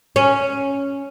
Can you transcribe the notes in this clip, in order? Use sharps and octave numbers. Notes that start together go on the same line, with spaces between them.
C#4